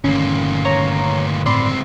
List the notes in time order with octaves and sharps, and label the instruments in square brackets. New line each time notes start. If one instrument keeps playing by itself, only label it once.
[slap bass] G1 D#3 E3 [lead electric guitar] D2 A#2 [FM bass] C#4
[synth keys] C#5 A#5 C#6
[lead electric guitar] C#2 C4 [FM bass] A2 [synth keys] D5 B5 C6